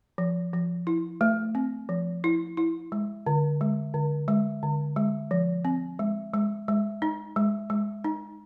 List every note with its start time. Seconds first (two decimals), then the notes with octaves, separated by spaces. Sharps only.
0.18 F3
0.53 F3
0.87 E4
1.21 A3
1.55 C4
1.89 F3
2.24 E4
2.57 E4
2.92 G#3
3.27 D3
3.61 G#3
3.94 D3
4.28 G#3
4.63 D3
4.96 G#3
5.31 F3
5.65 C4
5.99 G#3
6.34 G#3
6.68 G#3
7.02 D#4
7.36 G#3
7.70 G#3
8.04 D#4